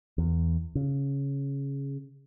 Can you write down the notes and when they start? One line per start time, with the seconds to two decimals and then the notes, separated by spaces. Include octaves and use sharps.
0.18 E2
0.75 C#3